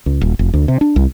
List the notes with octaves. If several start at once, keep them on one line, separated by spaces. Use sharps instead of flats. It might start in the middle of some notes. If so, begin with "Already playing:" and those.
C#2
D#1
F1
D2
C3
D4
C2